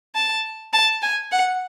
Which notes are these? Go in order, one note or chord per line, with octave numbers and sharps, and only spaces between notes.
A5
A5
G#5
F#5